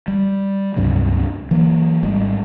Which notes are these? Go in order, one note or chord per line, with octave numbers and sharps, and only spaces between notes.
G3
C#2 G2 C3 F#3
E3 F#3 A#3
G#1 G3 G#3